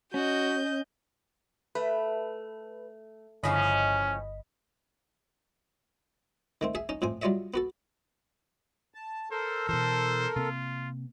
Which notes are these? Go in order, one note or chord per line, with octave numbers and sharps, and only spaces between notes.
C#4 F#4 D#5 G6
A3 B4
G1 A2 C#3 F3 C#4 D#5 B5
D#3 A3 C4
G#4 E5
C#4 D#4
F2 A2 C4 G#5
F#3 G3 F4 C#5 D#5 E5
B3 F#4 A4
A5
A4 A#4 C5
B2 E3 C5
C3 A#3 C4 F4